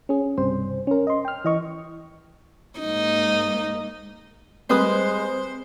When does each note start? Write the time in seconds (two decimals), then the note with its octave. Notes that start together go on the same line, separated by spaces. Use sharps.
0.09 C#4 G#4
0.38 B1 G2 C3 G3 C4 C5
0.87 C#4 A#4
1.07 D#5 C6
1.25 G5 F6
1.45 E3 D#5 C#6
2.80 G#2 A#3 D#4
4.70 G3 G#3 C4 G#4 B4 C5 D#6